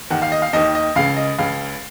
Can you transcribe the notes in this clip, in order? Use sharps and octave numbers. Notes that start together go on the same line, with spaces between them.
D#2 D#3 F#5
F5
D#5
F5
D#2 D#3 D#5
D#5
C#2 C#3 F5
D#5
C#2 C#3 F5